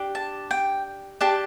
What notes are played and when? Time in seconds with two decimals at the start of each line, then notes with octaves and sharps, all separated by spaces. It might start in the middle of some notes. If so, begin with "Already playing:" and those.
Already playing: D4 G4
0.15 A5
0.51 G5
1.21 D4 G4 A5